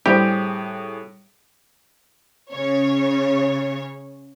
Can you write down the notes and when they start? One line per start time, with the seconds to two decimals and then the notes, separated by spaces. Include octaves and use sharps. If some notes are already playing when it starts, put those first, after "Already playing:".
0.06 A2 G3 C4 D4 E4 G4 G#4 D7
2.51 C#3 C#5